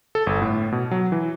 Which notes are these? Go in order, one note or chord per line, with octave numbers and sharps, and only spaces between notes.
A4
G1
A2
B2
F#3
E3